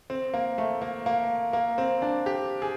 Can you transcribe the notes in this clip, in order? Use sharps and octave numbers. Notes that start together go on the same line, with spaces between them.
C4
A#3
A3
A#3
A#3
A#3
C4
D4
G4
G#4